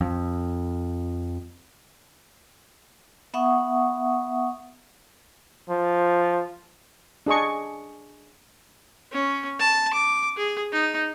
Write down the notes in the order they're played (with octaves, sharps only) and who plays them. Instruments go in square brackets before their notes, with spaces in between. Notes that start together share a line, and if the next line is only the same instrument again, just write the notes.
[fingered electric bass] F2
[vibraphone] B3 E5 F#5 C#6 D#6
[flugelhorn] F3
[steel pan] D4 G#4 D#5 C#6
[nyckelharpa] C#4
A5
D6
G#4
D#4